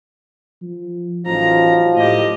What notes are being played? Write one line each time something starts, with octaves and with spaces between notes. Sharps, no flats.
F3
A1 F3 F#3 D#4 F4 A#5
A2 G4 D#5